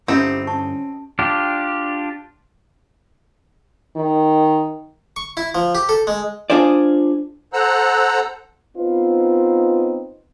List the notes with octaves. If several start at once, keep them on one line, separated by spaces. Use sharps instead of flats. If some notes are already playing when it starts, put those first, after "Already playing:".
G2 D3 C4 C#4 D#4 E4 G4
C#4 G4 A5 C#6
D4 F4 G4
D#3
C#6
E4
F3
G4
A4
G#3
D4 F4 G#4 C5 D5
A4 C5 F#5 A#5 E6 F#6
B3 C4 D#4 F4 B4